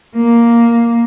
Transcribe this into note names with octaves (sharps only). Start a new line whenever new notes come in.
A#3